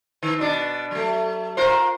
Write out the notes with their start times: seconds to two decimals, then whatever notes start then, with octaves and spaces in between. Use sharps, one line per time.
0.23 D#3
0.39 B2 D4
0.91 F#3 A3
1.57 F4 A#4 C5